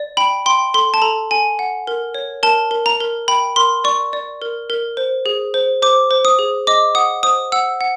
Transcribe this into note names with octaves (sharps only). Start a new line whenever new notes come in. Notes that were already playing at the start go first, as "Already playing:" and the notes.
Already playing: D5
G5 B5
G5 C6
A4 C6
A5
A4 A#5
A4 G#5
F#5
A#4
C#5
A#4 A5
A#4
A#5
A#4
G5 B5
A#4 C6
D5 C#6
D5
A#4
A#4
C5
G#4
C5
C5 D6
C5
D#6
G#4
D#5 D6
F#5 D#6
C5 D#6
F#5 E6
F#5